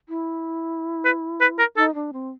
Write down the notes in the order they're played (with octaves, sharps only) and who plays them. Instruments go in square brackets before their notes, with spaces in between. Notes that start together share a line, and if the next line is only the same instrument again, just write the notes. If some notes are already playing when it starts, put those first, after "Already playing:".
[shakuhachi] E4
[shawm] B4
B4
A#4
[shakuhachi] D#4 [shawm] A4
[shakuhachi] D4
C4